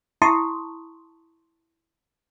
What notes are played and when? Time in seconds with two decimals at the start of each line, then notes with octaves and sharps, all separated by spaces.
0.22 E4 A5 A#5 C6 C#6 D#6